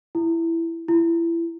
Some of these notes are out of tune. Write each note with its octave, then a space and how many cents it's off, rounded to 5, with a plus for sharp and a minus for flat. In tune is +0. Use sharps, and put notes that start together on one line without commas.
E4 +10
E4 +25